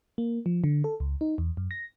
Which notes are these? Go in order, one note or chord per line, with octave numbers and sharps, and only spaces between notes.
A#3
F3
D3
A4
C#2
D#4
E2
F#2
A#6